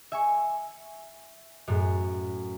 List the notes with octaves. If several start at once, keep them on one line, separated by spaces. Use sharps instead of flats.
E5 G#5 C#6
F#2 A2